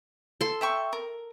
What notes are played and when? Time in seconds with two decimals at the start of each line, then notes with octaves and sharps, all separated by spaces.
0.41 A4 C6
0.61 E5 G5 C#6
0.93 A#4